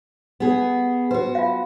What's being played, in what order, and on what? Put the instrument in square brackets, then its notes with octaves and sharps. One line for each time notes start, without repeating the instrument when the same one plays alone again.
[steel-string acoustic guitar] B3 G#4
[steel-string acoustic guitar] F#4 C5 [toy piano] B4
[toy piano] F4 F5